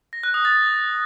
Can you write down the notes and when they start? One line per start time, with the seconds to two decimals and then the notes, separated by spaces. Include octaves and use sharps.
0.13 A#6
0.23 F#6
0.34 D#6
0.45 A6